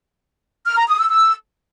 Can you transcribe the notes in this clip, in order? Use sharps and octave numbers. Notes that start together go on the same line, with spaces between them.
F6
A#5
D#6
E6
E6